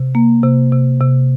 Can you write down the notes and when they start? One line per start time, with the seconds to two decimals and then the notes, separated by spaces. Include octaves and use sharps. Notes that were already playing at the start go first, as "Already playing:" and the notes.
Already playing: C3
0.15 A#3
0.43 C3
0.72 C3
1.01 C3